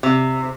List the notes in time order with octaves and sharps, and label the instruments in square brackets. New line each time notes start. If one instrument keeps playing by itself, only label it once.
[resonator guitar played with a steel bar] C3